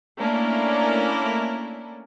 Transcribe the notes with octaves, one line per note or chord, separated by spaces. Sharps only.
A3 A#3 C#4 D4 E4